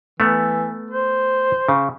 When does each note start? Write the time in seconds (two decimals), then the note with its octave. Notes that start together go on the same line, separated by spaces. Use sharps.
0.20 E3 A3 B3
0.90 C5
1.69 C#3